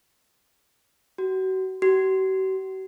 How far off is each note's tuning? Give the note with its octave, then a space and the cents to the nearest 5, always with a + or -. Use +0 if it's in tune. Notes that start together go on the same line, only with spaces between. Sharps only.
F#4 +35
F#4 +45